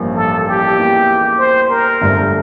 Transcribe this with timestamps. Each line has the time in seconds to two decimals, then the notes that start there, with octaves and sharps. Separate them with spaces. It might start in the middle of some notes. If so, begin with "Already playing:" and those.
Already playing: A1 G2 F3 A#3
0.15 A4
0.47 G4
0.77 E2 E3 A#3
1.39 C5
1.70 A#4
2.01 G1 G2 D3 A3